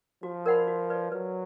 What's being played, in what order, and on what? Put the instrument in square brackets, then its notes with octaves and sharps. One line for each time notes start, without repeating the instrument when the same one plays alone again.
[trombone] F3 [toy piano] F#4
[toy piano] A#4 D5 F#5 B5
F#4
B4 D5
[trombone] F#3 [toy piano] B4